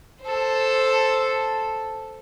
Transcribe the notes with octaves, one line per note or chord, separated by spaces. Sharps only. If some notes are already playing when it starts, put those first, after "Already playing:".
A4 C5